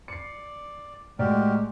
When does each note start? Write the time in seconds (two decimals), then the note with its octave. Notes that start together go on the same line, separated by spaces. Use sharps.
0.08 D5 C7 C#7
1.19 A2 G#3 F#4 G4 A#4 D5